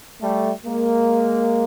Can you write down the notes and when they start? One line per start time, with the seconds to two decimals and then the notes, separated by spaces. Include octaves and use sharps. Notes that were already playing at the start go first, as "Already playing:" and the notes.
0.21 G3 A3
0.64 G#3 A#3